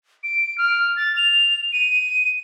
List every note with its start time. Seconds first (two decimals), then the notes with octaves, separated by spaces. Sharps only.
0.24 D7
0.58 F6
0.96 A6
1.17 F7
1.73 D#7